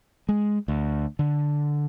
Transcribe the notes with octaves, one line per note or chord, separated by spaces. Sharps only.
G#3
D2
D3